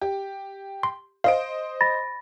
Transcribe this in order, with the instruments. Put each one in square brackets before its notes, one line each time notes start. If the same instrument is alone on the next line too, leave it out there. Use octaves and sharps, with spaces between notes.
[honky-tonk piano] G4
[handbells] C6
[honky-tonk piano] C5 D#5 D7 [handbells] F5
[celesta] B5 A6 A#6